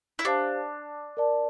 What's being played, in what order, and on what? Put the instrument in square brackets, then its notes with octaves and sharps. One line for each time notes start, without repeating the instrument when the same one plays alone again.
[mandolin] E4
[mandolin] D4 [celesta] G4 C5 F5 A5
[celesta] A#4 D5 A5